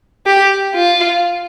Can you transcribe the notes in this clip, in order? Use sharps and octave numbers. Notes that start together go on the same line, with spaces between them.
G4
F4